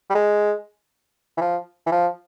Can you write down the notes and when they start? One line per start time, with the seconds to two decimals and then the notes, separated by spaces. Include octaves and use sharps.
0.10 G3
0.15 G#3
1.37 E3
1.41 F3
1.87 E3
1.92 F3